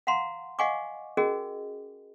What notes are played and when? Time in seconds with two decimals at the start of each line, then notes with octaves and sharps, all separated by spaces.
0.07 F5 F#5 A#5 C6
0.59 D#5 F5 F#5 G#5 C#6 D6
1.17 C#4 F#4 G#4 A#4 D#5